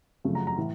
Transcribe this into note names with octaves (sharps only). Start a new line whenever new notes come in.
F#2 C#3 F3 A3
A#5
A#5
A2 E3